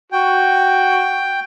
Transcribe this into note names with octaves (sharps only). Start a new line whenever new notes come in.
F#4 G5